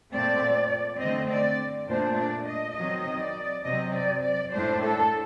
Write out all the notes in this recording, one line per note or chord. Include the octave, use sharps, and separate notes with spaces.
A#2 A3 C4 D5
D3 A3 C4 D#5
D5
A#2 A3 D4 C5
D5
D#5
D#3 F#3 C4 D#5
D5
C3 F#3 C4 D#5
D5
D5
A2 A3 D4 C5
A4